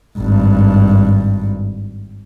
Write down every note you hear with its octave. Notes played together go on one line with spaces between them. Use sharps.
G#1 G2